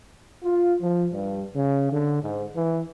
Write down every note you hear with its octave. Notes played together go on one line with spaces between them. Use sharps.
F4
F3
G2
C#3
D3
G#2
E3